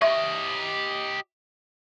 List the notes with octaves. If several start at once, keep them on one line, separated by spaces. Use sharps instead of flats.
G4 D#5 E5 C#6